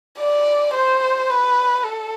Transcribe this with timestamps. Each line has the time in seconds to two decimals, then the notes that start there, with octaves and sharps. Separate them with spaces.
0.19 D5
0.74 C5
1.29 B4
1.85 A4